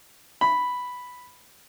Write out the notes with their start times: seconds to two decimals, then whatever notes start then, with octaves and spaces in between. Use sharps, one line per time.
0.41 B5